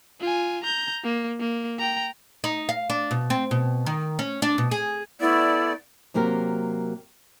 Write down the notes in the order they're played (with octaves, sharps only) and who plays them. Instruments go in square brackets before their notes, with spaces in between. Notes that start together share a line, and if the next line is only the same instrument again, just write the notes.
[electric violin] F4 G#5
A#5 G6
A#3
A#3
G5 A#5
[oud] D#4
F5
D4
B2
C4
B2
D#3
C#4
D4
B2
G#4
[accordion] A3 B3 D5 [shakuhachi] E4
[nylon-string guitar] C3 F#3 A#3 G4 A#4